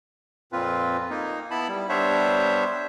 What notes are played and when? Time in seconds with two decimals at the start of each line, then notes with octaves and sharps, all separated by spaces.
0.52 F2 A#2 C4 F4 B4
1.10 A#3 D#4
1.51 B3 E4 A5 B5
1.68 G3
1.89 G3 B3 D4 C5 C#5 E5